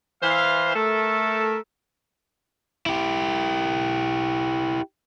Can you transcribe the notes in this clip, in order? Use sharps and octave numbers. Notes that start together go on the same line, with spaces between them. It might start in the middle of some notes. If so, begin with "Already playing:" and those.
E3 C5 F5
A3 A4 A#4
E4 G4